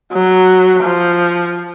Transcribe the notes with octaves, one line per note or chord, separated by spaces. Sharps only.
F#3
F3